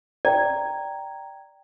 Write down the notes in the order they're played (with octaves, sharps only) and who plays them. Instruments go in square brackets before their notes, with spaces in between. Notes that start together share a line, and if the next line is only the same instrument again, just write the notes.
[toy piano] D5 [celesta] G5 A#5 G#6